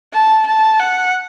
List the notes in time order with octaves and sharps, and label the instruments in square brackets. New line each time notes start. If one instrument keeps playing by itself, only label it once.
[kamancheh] A5
A5
F#5